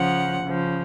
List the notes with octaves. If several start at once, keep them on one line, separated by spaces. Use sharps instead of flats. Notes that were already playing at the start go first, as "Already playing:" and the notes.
Already playing: C#3 F3 F#5
C#3 F3